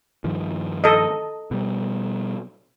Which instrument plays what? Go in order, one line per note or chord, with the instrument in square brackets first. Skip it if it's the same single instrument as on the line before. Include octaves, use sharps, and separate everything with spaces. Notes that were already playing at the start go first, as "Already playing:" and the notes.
[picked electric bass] G2 D#3 F3
[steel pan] A4 D#5
[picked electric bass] B2 G3